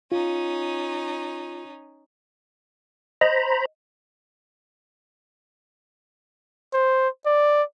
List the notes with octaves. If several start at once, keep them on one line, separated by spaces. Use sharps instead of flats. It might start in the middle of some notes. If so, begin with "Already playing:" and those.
C#4 D#4 F4
C5 D#5 A#5 B5
C5
D5